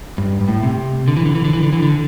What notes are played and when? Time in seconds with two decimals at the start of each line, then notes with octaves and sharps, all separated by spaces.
0.18 G2
0.41 G2
0.48 A2
0.63 C3
1.08 D3
1.17 E3
1.26 D3
1.35 E3
1.45 D3
1.53 E3
1.63 D3
1.73 E3
1.82 D3